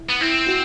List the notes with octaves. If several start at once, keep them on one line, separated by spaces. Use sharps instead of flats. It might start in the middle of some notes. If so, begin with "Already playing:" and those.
Already playing: E4
B3
C4 E4
F#4